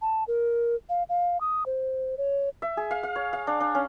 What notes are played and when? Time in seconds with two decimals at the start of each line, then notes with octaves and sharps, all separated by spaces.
0.02 A5
0.28 A#4
0.89 F5
1.09 F5
1.41 D#6
1.66 C5
2.18 C#5
2.62 E5
2.77 G#4
2.91 F5
3.03 F5
3.16 C#5
3.33 F5
3.47 D4
3.60 D4
3.75 C#4